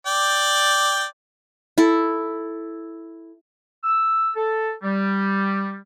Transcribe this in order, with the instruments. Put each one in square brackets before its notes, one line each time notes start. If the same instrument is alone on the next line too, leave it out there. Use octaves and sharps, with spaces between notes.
[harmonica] D5 G5
[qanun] E4 A4
[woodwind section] E6
A4
G3